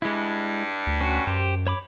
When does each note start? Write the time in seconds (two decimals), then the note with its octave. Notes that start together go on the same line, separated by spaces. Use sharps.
0.02 G2 G#3 E4
0.87 D2
1.01 C#4 F#4
1.27 F#2 G4 C5
1.67 C#5 B5 D6